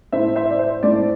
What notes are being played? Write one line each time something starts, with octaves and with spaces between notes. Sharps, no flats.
A2 A3 C4 E4 C5 E5
C5 E5
D5
C5
A2 A3 C4 E4 D5